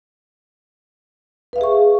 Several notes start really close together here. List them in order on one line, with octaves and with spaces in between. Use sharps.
B4 F5 E5 G#4 C#6